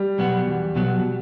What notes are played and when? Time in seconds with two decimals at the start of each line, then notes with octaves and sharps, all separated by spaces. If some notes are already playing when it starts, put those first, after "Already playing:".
Already playing: G3
0.18 B2 F#3 B3 F#4
0.47 E2
0.76 B2 F#3 B3 F#4